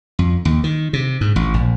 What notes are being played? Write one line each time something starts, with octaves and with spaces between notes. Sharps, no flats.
F2
D#2
D#3
C3
G#2
A1
A#1